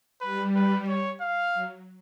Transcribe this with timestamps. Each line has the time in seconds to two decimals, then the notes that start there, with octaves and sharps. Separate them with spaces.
0.21 G3 B4
0.55 B4
0.88 C#5
1.21 F5
1.54 F#3